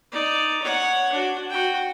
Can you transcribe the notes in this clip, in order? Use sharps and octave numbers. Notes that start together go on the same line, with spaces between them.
D#4 D5
C#5 F#5
D4 F#4
F#4 G5